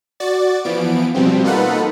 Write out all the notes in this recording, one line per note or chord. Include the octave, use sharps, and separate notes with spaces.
F#4 D5 A6
E3 F3 B3 D7
B2 F3 G3 C4
A#3 D#4 F4 A4 B4 F#5